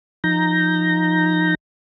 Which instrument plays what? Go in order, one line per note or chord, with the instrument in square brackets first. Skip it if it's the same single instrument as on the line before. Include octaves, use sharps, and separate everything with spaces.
[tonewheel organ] F3 D#4 A#5 G6 A#6